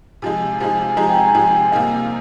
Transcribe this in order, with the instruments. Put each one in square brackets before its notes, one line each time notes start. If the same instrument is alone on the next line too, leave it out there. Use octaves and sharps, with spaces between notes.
[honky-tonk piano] C3 F3 G#3 D#4 [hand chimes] G#5
[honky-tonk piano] C3 F3 G#3 D#4 [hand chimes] G#5
[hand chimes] G#5
[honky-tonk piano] C3 F3 G#3 D#4 [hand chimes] A#5
[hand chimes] G5
G#5
[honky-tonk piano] C3 F3 G#3 D#4
[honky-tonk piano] C3 G3 A#3 D#4 [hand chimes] F5